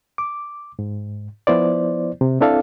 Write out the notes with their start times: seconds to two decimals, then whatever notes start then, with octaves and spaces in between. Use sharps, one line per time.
0.18 D6
0.79 G#2
1.47 F3 B3 E4 C5 D5
2.21 C3
2.40 C4 D4 E4 A4 D5 F5